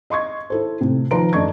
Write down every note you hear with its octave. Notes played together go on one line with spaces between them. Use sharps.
D#5 C6 C#6 G#6
E4 A4 C5
A2 C3
D#3 F3 B4 A#5 C6 D7
F#2 A3 D4 D#5 C#6 G#6